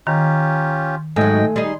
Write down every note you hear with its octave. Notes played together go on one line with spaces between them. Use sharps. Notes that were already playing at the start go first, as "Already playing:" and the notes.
D#3 C#4 F4 G4 A#5
G#2 F#3 A3 A4 D#5 G5 G#5
G3 D#4 G#4 C6